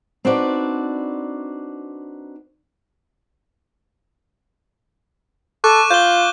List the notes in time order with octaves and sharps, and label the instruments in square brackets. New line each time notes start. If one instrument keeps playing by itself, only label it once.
[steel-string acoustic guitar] C4 D4 D#4 F#4 B4 D5
[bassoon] A4 [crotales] C#6 D6 F#6
[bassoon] F4 [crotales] G6 G7